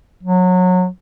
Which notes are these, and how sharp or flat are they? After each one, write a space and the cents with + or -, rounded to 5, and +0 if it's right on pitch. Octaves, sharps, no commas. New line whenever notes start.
F#3 -25